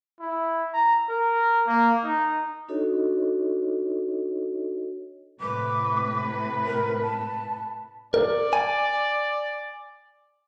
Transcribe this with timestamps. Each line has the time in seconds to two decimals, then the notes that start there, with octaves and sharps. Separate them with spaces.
0.20 E4
0.73 A#5
1.09 A#4
1.67 A#3
2.04 D#4
2.68 D4 D#4 F#4 A4 C#5 D#5
5.41 A2 C3 B4 D6
6.66 A#4
7.02 A5
8.14 A#4 D5
8.53 G#5